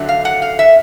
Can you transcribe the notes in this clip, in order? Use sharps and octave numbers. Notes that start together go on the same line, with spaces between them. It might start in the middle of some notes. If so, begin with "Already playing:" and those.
Already playing: D3 F#3 A3
F5
F#5
F5
E5